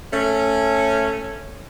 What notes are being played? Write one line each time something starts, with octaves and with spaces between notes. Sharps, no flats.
A3 C#4